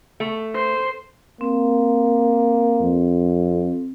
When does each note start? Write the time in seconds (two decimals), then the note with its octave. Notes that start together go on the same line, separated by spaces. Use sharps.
0.20 A3
0.54 C5
1.41 A#3 C4
2.80 F2